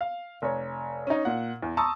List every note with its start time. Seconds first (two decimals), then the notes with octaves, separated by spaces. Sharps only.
0.01 F5
0.42 F1 C#5
1.07 C#4 D#4
1.25 A#2 F#5
1.62 E2
1.77 A5 A#5 C6 C#6 D#6 E6